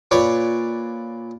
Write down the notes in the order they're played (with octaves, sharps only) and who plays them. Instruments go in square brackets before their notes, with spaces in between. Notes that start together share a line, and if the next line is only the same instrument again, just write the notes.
[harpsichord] A#2 B4 C#5 D5 D6